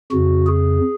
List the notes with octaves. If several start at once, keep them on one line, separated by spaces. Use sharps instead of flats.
F2 C#3 F#4
G#4